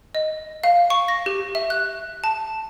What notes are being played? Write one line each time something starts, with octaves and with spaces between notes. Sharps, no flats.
D#5
F5
C#6
A#6
G4
E5
F#6
A5